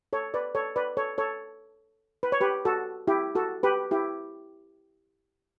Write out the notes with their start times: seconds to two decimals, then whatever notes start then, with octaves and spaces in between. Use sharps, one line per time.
0.13 A4 C#5
0.34 B4 D5
0.55 A4 C#5
0.76 B4 D5
0.97 A4 C#5
1.18 A4 C#5
2.23 B4
2.32 C#5
2.41 G4 B4
2.65 F#4 A4
3.07 E4 G4
3.35 F#4 A4
3.63 G4 B4
3.91 E4 G4